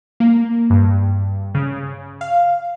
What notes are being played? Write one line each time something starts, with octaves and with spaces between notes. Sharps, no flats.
A#3
G2
C#3
F5